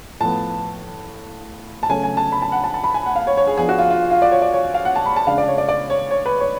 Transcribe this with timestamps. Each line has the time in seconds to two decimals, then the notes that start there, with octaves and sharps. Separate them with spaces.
0.20 A2 F3 B3 A5
1.83 A5
1.89 C#3 F#3 A3 C#4 G#5
2.03 G#5
2.17 A5
2.32 B5
2.42 A5
2.52 F#5
2.64 A5
2.74 A5
2.84 B5
2.94 G#5
3.06 F#5
3.16 F5
3.27 C#5
3.37 C#5
3.47 G#4
3.58 F3 B3 D4 G#4
3.69 F#4
3.79 F4
3.90 F4
4.11 F4
4.22 D5
4.32 C#5
4.42 D5
4.54 C#5
4.74 F5
4.85 F#5
4.96 A5
5.06 B5
5.16 A5
5.27 C#3 G#3 D4 F5
5.38 D5
5.48 C#5
5.58 D5
5.69 D5
5.90 C#5
6.11 C#5
6.26 B4
6.40 C#5